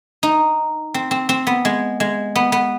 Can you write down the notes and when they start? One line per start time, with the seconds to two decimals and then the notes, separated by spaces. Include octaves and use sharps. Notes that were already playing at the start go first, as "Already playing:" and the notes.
0.23 D#4
0.94 C4
1.11 C4
1.29 C4
1.47 B3
1.65 G#3
2.00 G#3
2.35 B3
2.52 B3